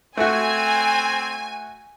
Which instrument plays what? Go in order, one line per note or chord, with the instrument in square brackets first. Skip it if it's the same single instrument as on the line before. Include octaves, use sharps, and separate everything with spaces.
[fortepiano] A3 F#4 [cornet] C4 [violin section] G#5